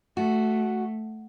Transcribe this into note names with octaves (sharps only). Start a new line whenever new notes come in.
A3 F#4